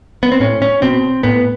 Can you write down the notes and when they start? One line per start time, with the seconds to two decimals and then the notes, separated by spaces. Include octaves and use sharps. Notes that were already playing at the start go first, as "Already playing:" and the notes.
0.23 B3
0.32 C4
0.40 A2 C#4
0.62 C#4
0.82 B2 C4
1.23 A2 B3